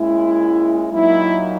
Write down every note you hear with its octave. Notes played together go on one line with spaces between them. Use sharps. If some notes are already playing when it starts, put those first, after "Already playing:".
Already playing: A#2 G#3 C#4 E4
A#2 F#3 A#3 D#4 E4